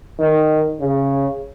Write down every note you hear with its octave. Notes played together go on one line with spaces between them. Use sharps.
D#3
C#3